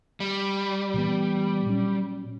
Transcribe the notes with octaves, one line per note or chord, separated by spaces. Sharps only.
G3
A#2 E3 B3
A#2 F#3 C#4